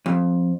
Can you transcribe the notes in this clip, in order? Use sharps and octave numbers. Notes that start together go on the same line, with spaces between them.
F2